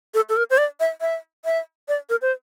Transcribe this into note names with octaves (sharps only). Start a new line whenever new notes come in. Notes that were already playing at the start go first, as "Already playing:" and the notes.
A4
A4
A#4
C5
D5
E5
E5
E5
D5
A#4
C5